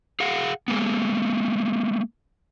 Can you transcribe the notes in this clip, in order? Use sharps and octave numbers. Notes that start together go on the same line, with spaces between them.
G#4 F5 F#5
G#3 A#3 B3